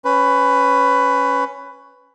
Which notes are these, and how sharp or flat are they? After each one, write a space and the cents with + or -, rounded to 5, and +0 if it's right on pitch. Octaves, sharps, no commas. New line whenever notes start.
C#4 +0 B4 +15